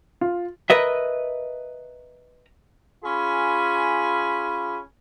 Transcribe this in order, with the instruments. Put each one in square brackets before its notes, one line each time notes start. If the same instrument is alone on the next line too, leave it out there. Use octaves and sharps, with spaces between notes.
[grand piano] F4
[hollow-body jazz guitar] A#4 B4 D#5 E5
[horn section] C#4 F4 G#4 G#5 B5